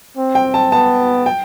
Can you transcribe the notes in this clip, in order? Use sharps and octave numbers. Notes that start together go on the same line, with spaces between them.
C4
G5
A5
B3 A5
G5